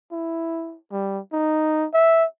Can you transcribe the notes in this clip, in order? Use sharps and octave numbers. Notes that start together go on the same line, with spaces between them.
E4
G3
D#4
E5